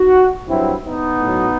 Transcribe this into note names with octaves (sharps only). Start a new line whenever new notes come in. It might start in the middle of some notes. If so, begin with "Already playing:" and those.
Already playing: D#4 F#4
G2 F#3 C4 E4
B3 D#4
A2 F#3